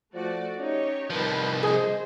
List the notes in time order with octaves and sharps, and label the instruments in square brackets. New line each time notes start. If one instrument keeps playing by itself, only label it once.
[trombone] F3 [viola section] A3 F#4 D5
[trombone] C#4 [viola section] D#4 G4 C#5
[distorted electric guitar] C2 F3 [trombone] D#3 [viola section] B4 A5
[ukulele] G#4 D#5 [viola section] C5